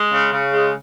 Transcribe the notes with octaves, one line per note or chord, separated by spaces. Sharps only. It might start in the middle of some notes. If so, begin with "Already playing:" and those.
Already playing: G#3
C#3
C#3
G#3